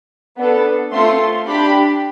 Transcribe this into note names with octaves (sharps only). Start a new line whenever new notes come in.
B3 D4 A4
A3 C4 F4 A4 C6
D4 G4 B5